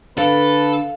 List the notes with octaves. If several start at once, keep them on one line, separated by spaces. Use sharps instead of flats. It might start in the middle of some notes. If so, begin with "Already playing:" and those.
D3 A4 B4 F5